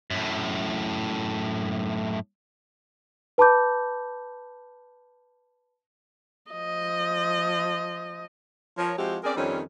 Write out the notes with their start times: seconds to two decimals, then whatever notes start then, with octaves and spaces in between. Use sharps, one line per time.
0.10 F#2 A2
3.38 B4 A5 B5 D6 G6
6.51 F3 D#5
8.78 F3 A#4 C#5
8.98 F3 G#3 C4 E4 F#4 G4
9.24 C4 C#4 G#4 A#4 D5
9.36 F2 D#3 G3 C4 C#4